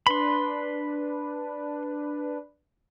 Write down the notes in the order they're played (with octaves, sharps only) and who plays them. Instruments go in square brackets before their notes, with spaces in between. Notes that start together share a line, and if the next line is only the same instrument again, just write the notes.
[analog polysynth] D4 B4 [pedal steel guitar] B5 C6